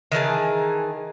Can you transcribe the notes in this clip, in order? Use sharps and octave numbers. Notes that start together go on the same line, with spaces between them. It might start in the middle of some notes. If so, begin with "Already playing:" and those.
D#3 E3 G#4 A5